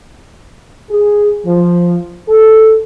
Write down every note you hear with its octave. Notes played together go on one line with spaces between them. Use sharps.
G#4
F3
A4